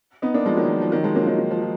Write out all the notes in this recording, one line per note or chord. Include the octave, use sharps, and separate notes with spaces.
B3 D#4
A#3 D4
F3 G#3
D#3 F#3
F3
F3
D#3 F#3
F3 G#3
F#3 A#3
F3
D#3 F#3
D#3
F3
F3